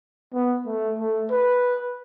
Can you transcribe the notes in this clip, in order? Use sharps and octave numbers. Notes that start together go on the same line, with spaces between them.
B3
A3
A3
B4